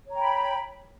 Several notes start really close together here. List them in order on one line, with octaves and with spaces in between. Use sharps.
C#5 A#5 G5 B5